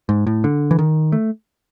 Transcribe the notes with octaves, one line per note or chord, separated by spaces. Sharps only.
G#2
A2
D3
E3
D#3
A3